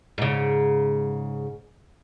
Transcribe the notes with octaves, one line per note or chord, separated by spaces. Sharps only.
G#2 C#3